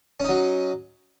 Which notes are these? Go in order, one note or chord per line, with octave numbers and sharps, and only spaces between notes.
F#3 C#4 D#4